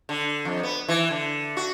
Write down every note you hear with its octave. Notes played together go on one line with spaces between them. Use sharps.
D3
F2
B3
E3
D3
F#4